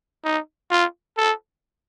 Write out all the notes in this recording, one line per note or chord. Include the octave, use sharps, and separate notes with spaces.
D#4
F4
A4